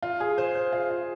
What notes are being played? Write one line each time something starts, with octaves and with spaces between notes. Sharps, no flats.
F4
G#4
C5
C5
F4
F4